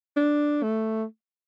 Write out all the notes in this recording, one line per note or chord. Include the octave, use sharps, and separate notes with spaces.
D4
A3